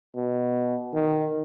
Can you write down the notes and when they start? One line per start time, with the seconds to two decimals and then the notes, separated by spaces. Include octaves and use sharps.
0.15 B2
0.94 D#3